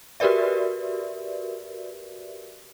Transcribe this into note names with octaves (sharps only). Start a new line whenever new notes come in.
F#4 G4 A#4 B4 D5 E5